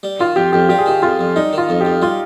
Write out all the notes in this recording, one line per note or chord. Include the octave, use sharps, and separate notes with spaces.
G3
D#3 F4
F2 G4
F2 G4
G3 G4
G#4
D#3 G4
F2 F4
F2
G3 D#4
D#3 F4
F2
F2 G4
G3 F4